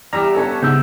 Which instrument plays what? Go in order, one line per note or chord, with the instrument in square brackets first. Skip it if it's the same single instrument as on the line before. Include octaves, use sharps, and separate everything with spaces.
[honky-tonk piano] E2 [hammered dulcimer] G3 E5 [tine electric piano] A#5
[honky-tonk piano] B3 C#4 A4
[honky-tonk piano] G#2 [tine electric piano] C#3 B3 [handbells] E6 G6